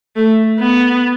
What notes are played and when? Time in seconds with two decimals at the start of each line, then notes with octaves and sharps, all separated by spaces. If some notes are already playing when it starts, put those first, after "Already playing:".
0.16 A3
0.59 B3